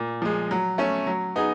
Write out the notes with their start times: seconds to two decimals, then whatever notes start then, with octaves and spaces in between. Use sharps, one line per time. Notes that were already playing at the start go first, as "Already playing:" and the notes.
Already playing: A#2
0.22 F3 G#3
0.51 F#3
0.78 A3 C#4
1.07 F#3
1.36 B3 D#4 G#4